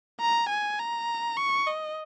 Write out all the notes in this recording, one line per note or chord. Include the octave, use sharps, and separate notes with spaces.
A#5
G#5
A#5
C#6
D#5